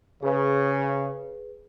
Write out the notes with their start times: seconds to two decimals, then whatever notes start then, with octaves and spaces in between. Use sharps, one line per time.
0.23 C#3 G#4 B4